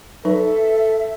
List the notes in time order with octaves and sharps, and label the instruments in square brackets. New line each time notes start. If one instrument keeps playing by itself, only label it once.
[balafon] F#3 D#4 B4 [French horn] A4 [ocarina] E5